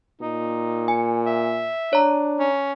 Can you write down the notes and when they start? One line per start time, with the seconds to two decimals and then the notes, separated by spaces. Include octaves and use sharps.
0.21 A#2 D#4
0.88 G#5
1.26 E5
1.93 D4 C#5 A#5
2.40 C#4